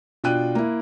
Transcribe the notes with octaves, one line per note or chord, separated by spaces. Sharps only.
B2 D4 F4 G5 F#6 D#7
A#3 E4